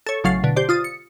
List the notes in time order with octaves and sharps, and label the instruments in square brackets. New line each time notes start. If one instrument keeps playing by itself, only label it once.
[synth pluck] A4 C#5
A1 C#3 F#3 F5 A6 C7
B2 D3
G4 C5 D5
F4 D#6 A6
C#7